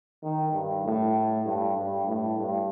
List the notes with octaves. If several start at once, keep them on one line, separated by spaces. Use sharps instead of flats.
D#3
G2
A2
G2
G2
A2
G2